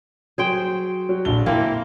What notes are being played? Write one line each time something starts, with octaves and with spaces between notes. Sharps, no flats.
F#3 G#4 C5 G5
F#3
A#1 D3 G7
E3 A#3 C4 E4 F5